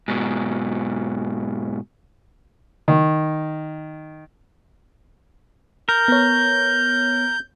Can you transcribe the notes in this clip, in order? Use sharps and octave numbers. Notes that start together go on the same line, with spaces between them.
G#2 B2
D#3
A#4 G6
B3 C#5